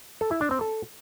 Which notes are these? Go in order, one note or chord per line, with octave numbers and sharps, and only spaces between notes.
A4
E4
D4
C4
A4